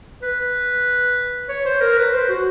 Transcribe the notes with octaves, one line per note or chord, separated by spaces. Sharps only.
B4
C#5
C5
A#4
B4
C5
F#4